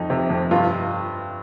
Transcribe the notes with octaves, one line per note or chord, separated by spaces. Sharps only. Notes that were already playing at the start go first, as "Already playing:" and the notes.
Already playing: F2 F3 D#4
C3
F2
G2 F4